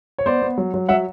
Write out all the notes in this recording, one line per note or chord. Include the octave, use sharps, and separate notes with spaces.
C#5
B3 C5 D5
B3
F#3
F#3
F#3 E5 F#5